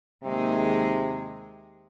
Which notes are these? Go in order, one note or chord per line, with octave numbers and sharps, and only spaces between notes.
D#2 C3 D#3 G#3 D#4 G#4